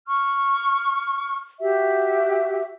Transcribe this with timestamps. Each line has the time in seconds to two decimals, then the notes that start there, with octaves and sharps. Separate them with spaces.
0.07 C#6 F6
1.61 F#4 G4 E5